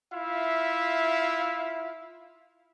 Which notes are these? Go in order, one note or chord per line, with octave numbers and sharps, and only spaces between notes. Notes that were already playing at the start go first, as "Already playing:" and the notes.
E4 F4 E5 F5